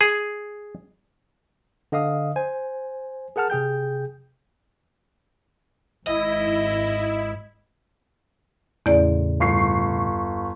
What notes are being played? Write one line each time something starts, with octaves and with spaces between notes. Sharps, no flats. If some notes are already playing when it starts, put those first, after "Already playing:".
G#4
D3 D#5 F5 D#6
C5 G#5
G#4 A#4 F#5 A5 F6
C3 G#4 G5 G6
G#1 E4 D#5
E2 A2 C#3 D5
G1 C#6 C7